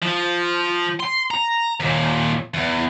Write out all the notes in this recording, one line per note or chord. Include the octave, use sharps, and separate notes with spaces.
F3
C6
A#5
D#2 A#2
E2